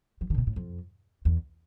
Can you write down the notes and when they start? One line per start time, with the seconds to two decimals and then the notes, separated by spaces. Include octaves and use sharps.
0.21 F3
0.30 D3
0.34 A#2
0.38 C3
0.47 A2
0.56 F2
1.25 E2